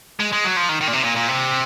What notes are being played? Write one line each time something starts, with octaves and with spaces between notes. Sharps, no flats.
G#3
G#3
F#3
F3
D#3
D#3
A#2
C3
A#2
A#2
C3